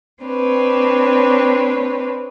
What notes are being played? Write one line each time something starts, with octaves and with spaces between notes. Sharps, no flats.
C4 D4 B4 C#5